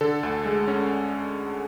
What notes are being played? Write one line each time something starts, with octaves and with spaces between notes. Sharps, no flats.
D3 A4
D2
G#3
C#4